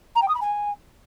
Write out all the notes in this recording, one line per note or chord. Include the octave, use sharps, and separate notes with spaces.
A#5
G5
D#6
B5
G#5